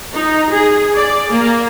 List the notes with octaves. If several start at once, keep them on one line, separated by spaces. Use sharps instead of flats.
D#4
G#4
D5
A#3